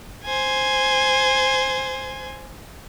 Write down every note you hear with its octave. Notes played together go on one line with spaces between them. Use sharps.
C5 G#5